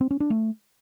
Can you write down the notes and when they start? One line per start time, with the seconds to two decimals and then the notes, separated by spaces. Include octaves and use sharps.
0.01 C4
0.11 C#4
0.20 D4
0.30 A3